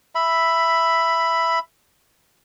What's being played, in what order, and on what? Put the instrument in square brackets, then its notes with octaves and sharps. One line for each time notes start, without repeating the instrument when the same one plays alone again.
[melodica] E5 B5